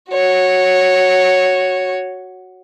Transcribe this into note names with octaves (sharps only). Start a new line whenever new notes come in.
F#4 C#5